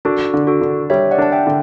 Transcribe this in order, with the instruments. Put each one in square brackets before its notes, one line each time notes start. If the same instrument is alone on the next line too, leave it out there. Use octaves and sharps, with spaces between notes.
[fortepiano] D4 [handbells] F#4 A4
[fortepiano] D3
[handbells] F#4 A4
[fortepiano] D3
[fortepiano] G3 [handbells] C#5 E5
[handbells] D5 F#5
[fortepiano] D4 [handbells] A5
[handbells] E5 G5
[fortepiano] D3